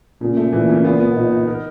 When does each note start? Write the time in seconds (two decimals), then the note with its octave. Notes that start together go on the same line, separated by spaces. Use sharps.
0.21 A#2 C#3
0.37 A3
0.53 A#2 E3
0.69 C#3
0.84 A#2 B3
1.00 B3
1.16 A#2 D#4
1.32 D#4
1.48 A#4